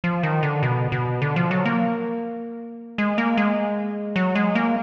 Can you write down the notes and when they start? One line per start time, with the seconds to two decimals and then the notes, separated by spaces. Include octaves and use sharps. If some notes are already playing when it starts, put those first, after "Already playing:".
0.04 F3
0.23 D#3
0.43 D3
0.63 B2
0.92 B2
1.22 D3
1.36 F3
1.51 F#3
1.65 A#3
2.98 G#3
3.18 A#3
3.37 G#3
4.16 F#3
4.35 G#3
4.55 A#3